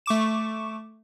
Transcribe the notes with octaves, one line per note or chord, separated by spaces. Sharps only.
A3 C#6 D6 E7